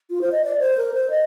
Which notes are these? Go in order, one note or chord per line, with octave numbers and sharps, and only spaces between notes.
F4
C5
D#5
D5
C5
A#4
C5
D#5